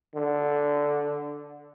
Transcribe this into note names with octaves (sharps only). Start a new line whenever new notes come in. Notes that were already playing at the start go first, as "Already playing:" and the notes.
D3